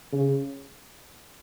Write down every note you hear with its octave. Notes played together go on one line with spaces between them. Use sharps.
C#3